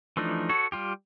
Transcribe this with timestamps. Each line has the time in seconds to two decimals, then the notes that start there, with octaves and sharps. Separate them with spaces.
0.17 E3 F3 A3 D4 D#4
0.49 F#4 A4 C#5
0.72 G3 F4 G4